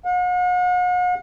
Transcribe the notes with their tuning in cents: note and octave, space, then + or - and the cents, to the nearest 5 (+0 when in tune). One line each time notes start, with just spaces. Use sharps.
F#5 -45